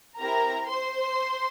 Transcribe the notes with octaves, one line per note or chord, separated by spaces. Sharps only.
C4 E4 G4 A#4 A#5
C5 C6